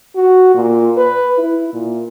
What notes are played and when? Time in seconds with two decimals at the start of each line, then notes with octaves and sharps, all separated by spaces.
0.16 F#4
0.55 A#2
0.97 B4
1.38 E4
1.74 A#2